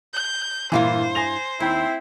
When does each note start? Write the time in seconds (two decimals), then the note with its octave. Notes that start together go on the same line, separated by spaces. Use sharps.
0.13 G6
0.72 G2 A#2 E3 E4 C5 F5
1.15 G#5 A#6 F7
1.60 D#2 C4 E4